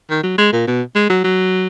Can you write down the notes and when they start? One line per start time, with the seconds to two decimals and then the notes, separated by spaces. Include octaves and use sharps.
0.10 D#3
0.23 F#3
0.38 G#3
0.53 A#2
0.67 B2
0.95 G#3
1.10 F#3
1.24 F#3